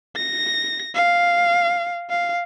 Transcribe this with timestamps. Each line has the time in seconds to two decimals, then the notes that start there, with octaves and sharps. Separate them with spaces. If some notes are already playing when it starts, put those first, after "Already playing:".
0.16 A#6
0.95 F5
2.10 F5